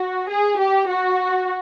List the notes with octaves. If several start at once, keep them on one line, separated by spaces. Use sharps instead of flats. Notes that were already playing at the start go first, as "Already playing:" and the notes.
Already playing: F#4
G#4
G4
F#4